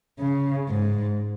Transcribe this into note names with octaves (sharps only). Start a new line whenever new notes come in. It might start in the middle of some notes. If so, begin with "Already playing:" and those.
C#3
G#2